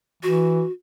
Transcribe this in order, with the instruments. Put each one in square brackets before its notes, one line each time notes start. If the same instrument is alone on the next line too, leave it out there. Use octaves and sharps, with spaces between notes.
[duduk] E3 [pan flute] F#4